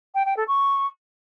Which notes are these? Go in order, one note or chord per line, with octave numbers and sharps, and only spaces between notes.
G5
G5
A4
C#6